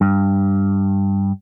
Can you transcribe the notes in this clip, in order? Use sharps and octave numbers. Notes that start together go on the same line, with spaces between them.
G2